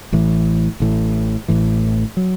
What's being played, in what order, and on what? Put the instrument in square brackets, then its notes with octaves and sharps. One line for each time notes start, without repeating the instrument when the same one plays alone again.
[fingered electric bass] A1 A2 E3
A1 A2 E3
A1 A2 E3
F#3